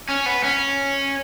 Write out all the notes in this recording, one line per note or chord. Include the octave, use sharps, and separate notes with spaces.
C#4
B3
C#4